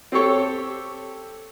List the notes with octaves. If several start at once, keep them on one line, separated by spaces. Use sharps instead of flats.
C4 G4 A4 C#5